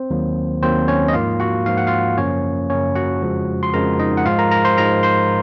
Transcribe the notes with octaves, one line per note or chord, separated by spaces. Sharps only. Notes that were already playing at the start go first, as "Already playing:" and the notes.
Already playing: C4 C5
D#2 D#3 F#3 A#3
D#2 D#3 F#3 A#3 C4 C5
C#4 C#5
D#5
G#2 F3 A#3 F4 F5
F#4 F#5
G#2 F3 A#3 F5
F#5
F4 F5
F#2 C#3 F3 A#3 C#4 C#5
F#2 C#3 F3 A#3 C#4 C#5
F#4 F#5
F2 C#3 F3 G#3
C6
F2 C#3 F3 G#3 A#4 A#5
D#4 D#5
F#5
G#2 F3 G#3 F4 F5
A#4 A#5
A#4 A#5
C5 C6
G#2 F3 G#3 A#4 A#5
C5 C6